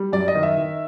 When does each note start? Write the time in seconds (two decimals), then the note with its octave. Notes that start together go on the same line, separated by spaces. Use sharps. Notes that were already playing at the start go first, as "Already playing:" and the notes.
Already playing: G3
0.13 F#2 D5
0.28 D#5
0.35 D#3
0.43 E5
0.58 D#3